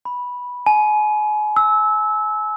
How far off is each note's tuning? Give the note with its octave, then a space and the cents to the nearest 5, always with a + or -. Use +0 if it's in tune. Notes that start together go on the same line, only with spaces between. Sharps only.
B5 -10
G#5 +35
E6 -20